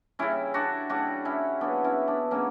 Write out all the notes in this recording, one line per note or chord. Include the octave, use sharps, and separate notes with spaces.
C#3 G3 C#4 E4
D4 F#4
C#3 G3 D4 F#4
C#4 E4
C#3 F#3 B3 D4
C#4 E4
B3 D4
C#3 F#3 A#3 C#4